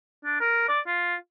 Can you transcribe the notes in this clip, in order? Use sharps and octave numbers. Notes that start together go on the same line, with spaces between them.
D4
A#4
D5
F4